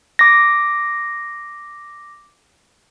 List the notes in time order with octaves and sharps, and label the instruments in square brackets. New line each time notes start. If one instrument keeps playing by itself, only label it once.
[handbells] D6 A#6